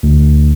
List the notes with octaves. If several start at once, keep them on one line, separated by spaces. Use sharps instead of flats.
D2